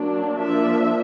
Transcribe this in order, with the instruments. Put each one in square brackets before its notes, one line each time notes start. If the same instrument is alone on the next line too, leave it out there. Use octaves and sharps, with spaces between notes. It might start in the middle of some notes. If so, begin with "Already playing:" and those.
Already playing: [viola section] F#3 A#3 D4
F3 A#3 D4 E5